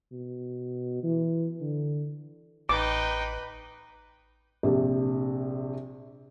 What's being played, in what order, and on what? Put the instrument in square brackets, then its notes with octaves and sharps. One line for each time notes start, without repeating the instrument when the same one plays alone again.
[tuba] B2
E3
D3
[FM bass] A1 [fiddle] D#4 G5 [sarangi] B4 [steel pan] D6
[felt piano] A#1 C3